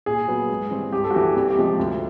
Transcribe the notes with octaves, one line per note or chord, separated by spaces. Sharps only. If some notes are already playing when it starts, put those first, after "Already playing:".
A#2 G#4
F#3 B3
G#2
E3 G3 C4
G2 G4
A4
F#4
E3 G3 G4
C2
G4
C3 F3 G#3
D2